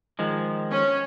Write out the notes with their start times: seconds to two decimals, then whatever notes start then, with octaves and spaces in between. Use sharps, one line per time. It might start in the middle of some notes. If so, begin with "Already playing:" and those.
0.19 D#3 F3 G#3
0.72 C#4